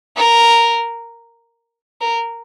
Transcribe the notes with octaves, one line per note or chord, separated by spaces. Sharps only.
A#4
A#4